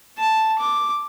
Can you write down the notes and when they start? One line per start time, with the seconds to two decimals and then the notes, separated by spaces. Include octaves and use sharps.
0.19 A5
0.59 D6